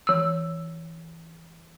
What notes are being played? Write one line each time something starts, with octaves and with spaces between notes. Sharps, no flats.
E3 E6